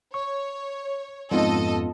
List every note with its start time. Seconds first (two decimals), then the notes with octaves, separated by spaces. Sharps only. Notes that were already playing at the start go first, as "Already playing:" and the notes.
0.14 C#5 C#6
1.31 F2 G#2 B3 C#4 F4 A4 D#5